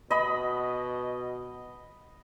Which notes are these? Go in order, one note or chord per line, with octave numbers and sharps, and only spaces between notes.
B2 D#5 B5